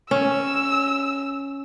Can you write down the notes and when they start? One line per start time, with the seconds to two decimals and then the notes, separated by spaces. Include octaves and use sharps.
0.11 C#4 E6